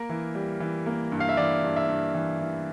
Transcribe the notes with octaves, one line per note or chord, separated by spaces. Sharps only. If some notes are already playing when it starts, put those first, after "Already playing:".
Already playing: A#3 A#4
E3
G3
E3
A#3
G2
F5
E5
E3 D5
G2
E5
G2
E3
E3